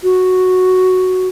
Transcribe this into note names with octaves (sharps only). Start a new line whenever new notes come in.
F#4